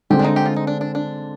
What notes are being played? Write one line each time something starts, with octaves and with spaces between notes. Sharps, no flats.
D3 G#3 C4 G4
D4
D#4
G4
F4
D#4
D4
D4
D4